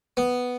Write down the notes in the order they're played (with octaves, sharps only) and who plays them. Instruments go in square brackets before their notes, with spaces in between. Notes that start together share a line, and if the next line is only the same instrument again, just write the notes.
[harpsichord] B3